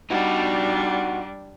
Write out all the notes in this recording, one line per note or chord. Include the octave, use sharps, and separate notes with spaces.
G3 D4 D#4 F#4